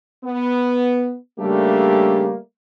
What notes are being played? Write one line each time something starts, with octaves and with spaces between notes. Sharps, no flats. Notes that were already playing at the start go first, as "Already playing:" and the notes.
B3
C#3 G3 A3 A#3 D4 G4